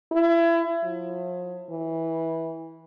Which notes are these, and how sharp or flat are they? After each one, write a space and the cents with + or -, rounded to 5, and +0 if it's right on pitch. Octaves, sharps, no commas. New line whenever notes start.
E4 +30
F3 +40
E3 -15